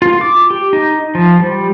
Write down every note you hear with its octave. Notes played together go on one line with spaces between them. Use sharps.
F4
D6
G4
D#4
F3
G3